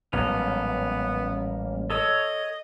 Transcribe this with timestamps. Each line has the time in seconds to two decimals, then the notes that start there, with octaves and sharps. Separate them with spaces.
0.13 A1 G#2 F#3 G3 A#3 B3 C#4
1.90 A4 C#5 D#5 E6